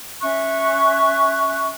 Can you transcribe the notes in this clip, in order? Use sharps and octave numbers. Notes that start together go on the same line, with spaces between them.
C#4 E5 C#6 F#6